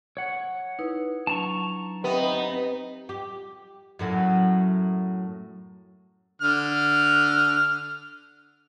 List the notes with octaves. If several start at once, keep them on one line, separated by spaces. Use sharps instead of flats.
C#5 F#5
D#4 E4 B4
F#3 D4 A5 A#5 C#6
B3 C4 D#4 G4 E5 G5
G4
F#2 A2 F#3
D3 F6